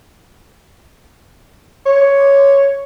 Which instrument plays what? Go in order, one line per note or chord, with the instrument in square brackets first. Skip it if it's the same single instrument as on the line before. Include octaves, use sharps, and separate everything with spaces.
[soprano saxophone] C#5